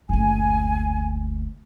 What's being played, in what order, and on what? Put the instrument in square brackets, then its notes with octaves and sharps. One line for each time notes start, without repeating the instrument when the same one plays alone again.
[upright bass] F#1 D2 [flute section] G#5